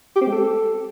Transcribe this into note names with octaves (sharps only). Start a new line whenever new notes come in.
G4
C4
G#3
A4